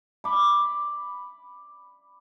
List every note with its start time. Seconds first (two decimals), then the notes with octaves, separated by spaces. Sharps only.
0.24 B5 D6